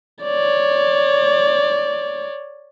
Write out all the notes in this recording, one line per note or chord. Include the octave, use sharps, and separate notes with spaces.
C#5 D5